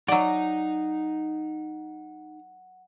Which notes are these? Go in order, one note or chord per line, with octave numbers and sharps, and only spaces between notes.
F#3 D#4 D5 F#5